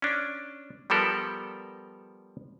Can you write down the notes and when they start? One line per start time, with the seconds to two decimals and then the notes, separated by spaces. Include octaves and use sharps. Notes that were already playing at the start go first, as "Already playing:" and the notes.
0.02 C#4 D4
0.90 F3 G3 B3 A4 A#4